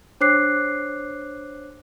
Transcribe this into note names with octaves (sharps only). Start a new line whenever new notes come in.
D4 C5 C#5 D6 F#6 C7